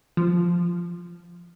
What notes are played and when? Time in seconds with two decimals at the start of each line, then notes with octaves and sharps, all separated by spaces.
0.17 F3